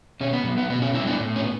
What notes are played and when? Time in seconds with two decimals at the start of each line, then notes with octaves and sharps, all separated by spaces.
0.21 B2 C#4
0.33 B3
0.45 F#3 B3
0.58 B3
0.70 B2 B3
0.82 C#4
0.94 G3 B3 C#4 E4
1.07 B3 D4
1.20 A2
1.36 C#4
1.44 B3